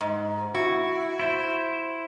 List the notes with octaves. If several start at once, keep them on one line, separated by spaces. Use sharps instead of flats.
G#2
E4 F#4
E4 C5